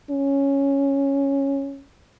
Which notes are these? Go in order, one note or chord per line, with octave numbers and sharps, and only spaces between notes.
C#4